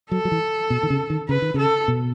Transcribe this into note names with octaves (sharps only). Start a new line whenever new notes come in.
F#3 A4
F#3
E3
B2
D#3
C#3
D#3
C#3 B4
D#3
C#3 A4
B2